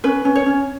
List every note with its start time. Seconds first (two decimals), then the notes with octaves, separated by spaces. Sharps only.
0.04 C#4 B4
0.25 C#4
0.35 C#5
0.46 C#4